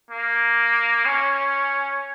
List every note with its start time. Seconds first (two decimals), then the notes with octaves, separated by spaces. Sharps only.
0.11 A#3
1.06 C#4